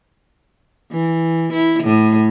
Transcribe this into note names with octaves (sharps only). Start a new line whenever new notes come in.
E3
E4
A2